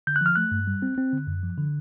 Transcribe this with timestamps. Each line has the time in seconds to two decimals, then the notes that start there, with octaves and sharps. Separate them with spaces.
0.07 D3 G6
0.16 F#6
0.21 F3 F6
0.36 A3 F#6
0.52 G2
0.67 G3
0.82 C4
0.97 C4
1.13 D3
1.27 F#2
1.43 F3
1.58 D3